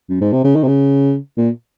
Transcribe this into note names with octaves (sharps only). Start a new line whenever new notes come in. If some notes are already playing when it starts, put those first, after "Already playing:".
F#2
G#2
C3
C#3
D#3
C3
C#3
A#2